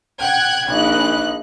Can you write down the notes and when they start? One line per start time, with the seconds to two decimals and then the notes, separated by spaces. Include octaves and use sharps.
0.21 F#5 G5 F#6 G#6
0.68 A#1 D#4 F#6